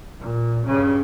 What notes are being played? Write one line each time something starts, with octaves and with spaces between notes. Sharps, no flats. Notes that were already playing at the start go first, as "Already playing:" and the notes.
A#2
G2 C#3